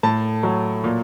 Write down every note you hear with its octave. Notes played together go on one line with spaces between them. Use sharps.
A2 A5
F#3
A#2